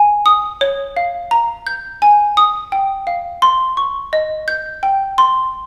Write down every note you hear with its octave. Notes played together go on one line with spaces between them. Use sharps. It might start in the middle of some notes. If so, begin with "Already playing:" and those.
Already playing: G#5
D#6
C#5
F5
A#5
G6
G#5
D#6
G5
F5
C6
C#6
D#5
G6
G5
C6